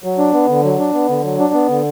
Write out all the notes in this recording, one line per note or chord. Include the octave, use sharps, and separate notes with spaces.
F#3
D4
B3
D3
F#3
D4
B3
D3
F#3
D4
B3
D3